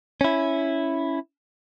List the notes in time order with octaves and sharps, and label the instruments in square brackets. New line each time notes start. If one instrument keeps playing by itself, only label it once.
[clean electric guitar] C#4 E4